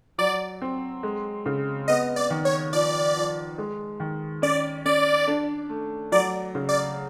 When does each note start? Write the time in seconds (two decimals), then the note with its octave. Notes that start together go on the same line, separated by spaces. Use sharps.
0.18 F#3 D5
0.61 C4
1.03 G#3
1.46 C#3
1.88 B3 D#5
2.16 D5
2.30 D#3
2.45 C#5
2.73 F3 D5
3.16 F3
3.58 G#3
4.00 D#3
4.42 C#4 D5
4.85 C#4 D5
5.28 D4
5.69 A3
6.12 F#3 D5
6.55 C#3
6.69 D5